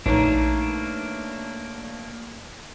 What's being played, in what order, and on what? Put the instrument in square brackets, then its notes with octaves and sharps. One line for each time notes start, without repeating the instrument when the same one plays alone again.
[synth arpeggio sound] A#1 [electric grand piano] A3 B4 C#5 [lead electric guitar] A#3 D4 [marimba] D#4 A#5